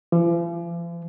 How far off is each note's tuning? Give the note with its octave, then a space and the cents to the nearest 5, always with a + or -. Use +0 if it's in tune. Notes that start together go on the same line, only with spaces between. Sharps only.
F3 -45